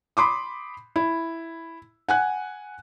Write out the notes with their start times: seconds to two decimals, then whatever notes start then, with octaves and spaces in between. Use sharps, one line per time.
0.17 B5 C6 D6 D#6
0.96 E4
2.09 F#5 G#5 F#6